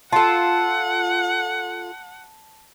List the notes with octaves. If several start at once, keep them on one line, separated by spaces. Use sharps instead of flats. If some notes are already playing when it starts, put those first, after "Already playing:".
F4 A4 F#5 A5